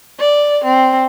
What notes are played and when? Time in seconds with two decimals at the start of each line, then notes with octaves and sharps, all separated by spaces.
0.19 D5
0.64 C4